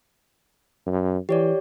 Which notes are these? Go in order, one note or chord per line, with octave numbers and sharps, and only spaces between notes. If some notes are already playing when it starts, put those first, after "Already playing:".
F#2
E3 G4 C#5 D5